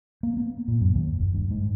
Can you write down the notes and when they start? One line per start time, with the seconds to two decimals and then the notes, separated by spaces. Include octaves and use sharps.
0.23 A#3
0.37 B3
0.68 A#2
0.81 F#2
0.95 D#2
1.18 F#1
1.35 G2
1.51 G#2